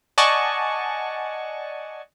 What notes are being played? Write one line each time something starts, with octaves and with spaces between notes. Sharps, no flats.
D5 D#5 F#5 G#5 A5 C#6